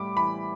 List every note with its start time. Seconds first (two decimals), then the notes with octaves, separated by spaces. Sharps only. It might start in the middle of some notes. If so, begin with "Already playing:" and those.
Already playing: A2 G3 B5 D6
0.16 E3 B5